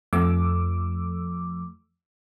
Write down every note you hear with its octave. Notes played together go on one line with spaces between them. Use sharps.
F2 F3 A3 D6 E6